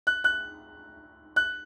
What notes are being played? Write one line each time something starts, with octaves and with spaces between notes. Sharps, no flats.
F#6
F#6
F#6